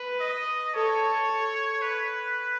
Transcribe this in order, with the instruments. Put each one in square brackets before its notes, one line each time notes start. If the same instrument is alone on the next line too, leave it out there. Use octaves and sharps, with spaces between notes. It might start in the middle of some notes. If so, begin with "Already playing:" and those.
Already playing: [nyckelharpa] B4
[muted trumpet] D#5
[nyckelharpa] A4 [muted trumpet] C#5
[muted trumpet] B4